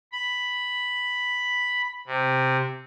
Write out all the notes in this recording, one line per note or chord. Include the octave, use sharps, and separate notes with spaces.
B5
C3